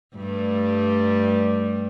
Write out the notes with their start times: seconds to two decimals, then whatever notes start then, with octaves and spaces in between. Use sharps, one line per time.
0.16 G2 G3 A3